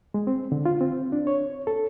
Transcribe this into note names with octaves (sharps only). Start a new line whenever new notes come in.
G#3
C4
D3
F4
C4
D4
C#5
A4